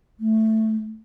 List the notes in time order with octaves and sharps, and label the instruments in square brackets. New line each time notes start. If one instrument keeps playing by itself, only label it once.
[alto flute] A3